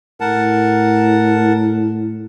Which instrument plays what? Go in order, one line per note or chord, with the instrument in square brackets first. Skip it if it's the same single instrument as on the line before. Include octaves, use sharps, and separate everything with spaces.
[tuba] A2 [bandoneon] A#4 F#5 A5